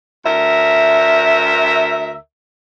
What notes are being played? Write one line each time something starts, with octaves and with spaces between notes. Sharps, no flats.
D2 A#4 E5